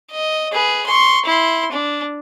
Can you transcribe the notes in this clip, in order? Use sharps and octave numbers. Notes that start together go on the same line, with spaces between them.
D#5
G#4 B4
C6 C#6
E4 C6
D4